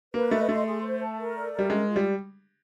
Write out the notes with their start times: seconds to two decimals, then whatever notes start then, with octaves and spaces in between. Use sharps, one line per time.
0.14 A#3 B4
0.31 A3 D#5
0.49 A3 C6
0.66 G#4
0.83 C5
1.00 A5
1.18 A#4
1.36 D5
1.53 A#4
1.59 G3
1.70 G#3 C#4
1.87 F4
1.96 G3